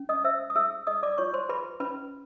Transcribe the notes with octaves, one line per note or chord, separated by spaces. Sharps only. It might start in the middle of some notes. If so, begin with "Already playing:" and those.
Already playing: C#4
D#5 D#6
C5 E5 E6
D#6
G#4 E5 E6
G#4 D#5 D#6
D5 D6
F4 C#5 C#6
C5 C6
G#4 B4 B5
C#4 B4 B5